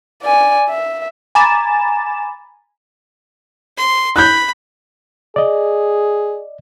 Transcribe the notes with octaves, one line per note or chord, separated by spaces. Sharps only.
D5 G#5
E5
G#5 A#5 B5 D6 A6 E7
C6
B5 F#6 G6
G#4 D5 D#5